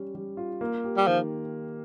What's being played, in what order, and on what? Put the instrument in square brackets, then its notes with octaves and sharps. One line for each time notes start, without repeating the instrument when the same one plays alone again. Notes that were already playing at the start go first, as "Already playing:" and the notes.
Already playing: [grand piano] G3 C#4
G3
F4
A#3
G4
[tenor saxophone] G3
[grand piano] D#3 [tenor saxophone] F3